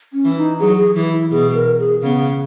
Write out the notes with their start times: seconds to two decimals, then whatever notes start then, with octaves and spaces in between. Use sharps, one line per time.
0.13 C#4
0.24 E3
0.37 D#4
0.60 F#3 G#4
0.78 G#4
0.95 E3 E4
1.13 E4
1.31 B2 G#4
1.54 A#4
1.79 G#4
2.02 C#3 B3